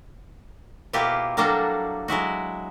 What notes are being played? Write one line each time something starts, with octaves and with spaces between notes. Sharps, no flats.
B2 A#3 E4 F4 G4
F#3 G3 A#3 D4 F#4 A4
F#3 G#3 E4 F#4